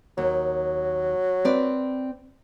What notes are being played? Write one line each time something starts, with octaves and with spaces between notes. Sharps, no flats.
D#2 F#3
C4 B4 D5